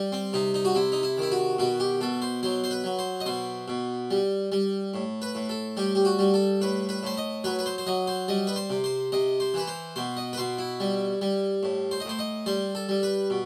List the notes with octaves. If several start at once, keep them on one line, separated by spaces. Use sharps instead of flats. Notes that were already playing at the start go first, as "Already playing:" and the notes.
Already playing: G3
C4
C3 D#4
D#4
F#4
C3 E4
D#4
E4
D#3 E4
F#4
B2 F#4
G4
B2 A4
C5
F#3 C5
C5
B4
F#3
C5
D#5
B2 C5
B2
G3
G3
A2
B4
A2
A4
G3 G4
G4
F#4
G3
A4
A2 B4
B4
A2 C5
D#5
F#3 B4
B4
C5
C5
F#3 D#5
C5
G3 D#5
B4
C5
C3
C5
C3 D#5
C5
E3 B4
C5
B2 C5
D#5
B4
B2 C5
E4
G3
G3
A2
C5
D#5
A2 C5
D#5
G3 C5
A4
G3
B4
B2